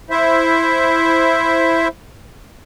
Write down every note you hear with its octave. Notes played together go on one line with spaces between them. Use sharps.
E4 C5 E5